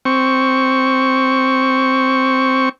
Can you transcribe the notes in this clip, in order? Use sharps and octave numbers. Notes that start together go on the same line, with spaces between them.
C4 C#6